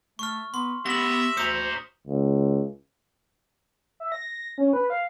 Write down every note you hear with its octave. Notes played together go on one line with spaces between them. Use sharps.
A3 C#6 F6
B3 C6
B3 G4 E5 A#6 F#7
D2 C5 A#5 D#6 C#7
C#2
E5
A#6
C#4
B4
F5